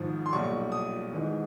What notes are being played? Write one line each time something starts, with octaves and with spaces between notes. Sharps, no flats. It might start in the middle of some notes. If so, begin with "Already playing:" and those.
Already playing: G#1 G#2 F3
C6
B1 A#2 G3 C#6
D#6
G#1 G#2 E3 G#3